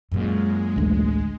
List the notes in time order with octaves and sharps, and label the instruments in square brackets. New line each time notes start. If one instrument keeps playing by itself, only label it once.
[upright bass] F#2 A#2 [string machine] G#3
[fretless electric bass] A1 D2